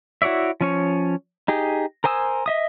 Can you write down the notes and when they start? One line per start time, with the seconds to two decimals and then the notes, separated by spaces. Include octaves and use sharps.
0.22 E4 F#4 C#5 D5 E5
0.61 F3 C#4 C#5
1.48 D#4 G4 G#4
2.04 A#4 C5 G#5 D#6 E6
2.46 D#5 E5 D#6